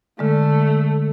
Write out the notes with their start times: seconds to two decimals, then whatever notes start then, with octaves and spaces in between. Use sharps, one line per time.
0.19 D3 G#3 A3